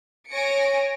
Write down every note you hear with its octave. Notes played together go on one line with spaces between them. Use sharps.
C#5 G#5 A#6 C#7 D7